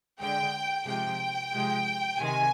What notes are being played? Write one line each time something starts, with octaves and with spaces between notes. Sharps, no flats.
D3 G#3 G5
C3 F3 G#3 G5
C3 F3 G#3
C3 D#3 G#3 G#5